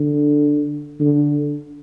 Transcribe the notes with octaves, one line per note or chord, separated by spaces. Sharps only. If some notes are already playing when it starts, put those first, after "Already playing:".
Already playing: D3
D3